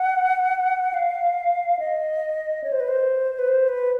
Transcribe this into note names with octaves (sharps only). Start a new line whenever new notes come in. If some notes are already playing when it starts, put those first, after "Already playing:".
Already playing: F#5
F5
D#5
C#5
C5
B4
C5
B4
C5
B4